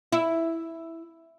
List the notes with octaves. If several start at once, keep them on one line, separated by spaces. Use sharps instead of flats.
E4